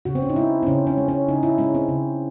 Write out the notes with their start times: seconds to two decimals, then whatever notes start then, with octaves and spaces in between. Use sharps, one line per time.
0.05 C#3 F#4
0.15 C4
0.22 C#4
0.29 D#4
0.36 G#3 E4
0.63 C4
0.67 C#3 C#4
0.87 C#4
0.98 G#3
1.08 C#4
1.28 C#3 D#4
1.43 E4
1.58 G#3 C#4
1.74 C4
1.89 C#3